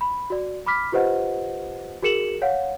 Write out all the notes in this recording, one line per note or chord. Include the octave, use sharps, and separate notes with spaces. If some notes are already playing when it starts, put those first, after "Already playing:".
B5
F#4 D5
B5 D6 F6 B6
F4 G4 B4 C5 D#5 F#5
F#4 G#4 A#4 C#7 E7 F#7
C#5 F5 F#5